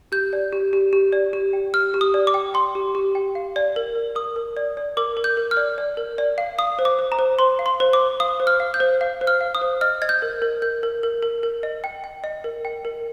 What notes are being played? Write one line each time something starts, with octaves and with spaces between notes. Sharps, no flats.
G4 G6
D5
G4
G4
G4
D5
G4
G5
G4 F6
G4
D#6
D5
D6
G5
G5 C6
G4
G4
G5
F5
D5
A#4
A#4
A#4 D#6
A#4
D5
D5
A#4 D6
A#4
G6
A#4
F6
D5
D5
A#4
D5
F5
F5 D#6
C5
D6
C5
A#5
C5
C5 C6
F5
C6
C5
D6
C5
F5 D#6
C5
F6
F5
G6
C5
F5
C5
F6
F5
D#6
C5
D#5 F6
D#5 G#6
G6
A#4
A#4
A#4 G6
A#4
A#4
A#4
A#4
D#5
G5
G5
D#5
A#4
G5
A#4